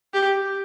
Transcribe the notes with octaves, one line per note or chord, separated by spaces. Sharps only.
G4